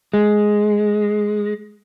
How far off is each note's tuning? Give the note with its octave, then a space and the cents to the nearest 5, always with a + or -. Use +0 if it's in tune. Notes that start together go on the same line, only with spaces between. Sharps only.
G#3 +5